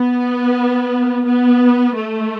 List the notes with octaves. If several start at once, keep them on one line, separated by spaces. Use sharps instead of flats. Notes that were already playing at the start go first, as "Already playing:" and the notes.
Already playing: B3
B3
A3